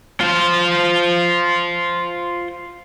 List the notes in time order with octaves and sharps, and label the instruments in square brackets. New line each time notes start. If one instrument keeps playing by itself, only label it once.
[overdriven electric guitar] F4 C5